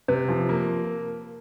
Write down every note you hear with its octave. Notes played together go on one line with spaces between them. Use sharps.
C3 B4
F3
A#3